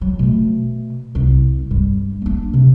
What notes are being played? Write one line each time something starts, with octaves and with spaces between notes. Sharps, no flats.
F#3
B2 A3
C2
G2 G3
A#3 D4
C3